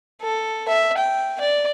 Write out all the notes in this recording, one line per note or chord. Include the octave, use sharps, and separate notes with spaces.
A4
E5
G5
D5